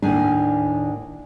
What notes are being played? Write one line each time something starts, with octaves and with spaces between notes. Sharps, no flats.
D#2 A2 D4 G#5